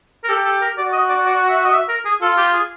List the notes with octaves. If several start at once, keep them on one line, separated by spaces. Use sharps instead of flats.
A#4
G4 A4
A4
A#4
F#4 D5
D#5
D5
D5
E5
D#5
E5
A#4
G#4
F4 A4
G4
G#4